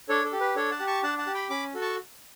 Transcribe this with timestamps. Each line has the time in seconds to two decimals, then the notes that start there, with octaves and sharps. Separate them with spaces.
0.09 D4 A4 C#5
0.24 A4
0.32 G4
0.40 B4
0.55 D4 A4 C#5
0.71 F#5 A5
0.80 G4
0.87 A5 C#6
1.03 D4 F#5 A5
1.18 F#5 A5
1.27 G4
1.34 G5 B5
1.50 C#4 B5 D6
1.74 F#4 A4
1.81 A5 C#6